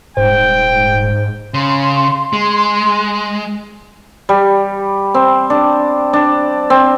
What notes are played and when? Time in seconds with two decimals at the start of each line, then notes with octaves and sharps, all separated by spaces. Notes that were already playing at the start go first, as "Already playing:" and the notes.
0.17 D#1 G#2 C5 G5
1.54 C#3 C6
2.33 G#3
4.29 G3
5.14 C4
5.50 D4
6.13 D4
6.70 C4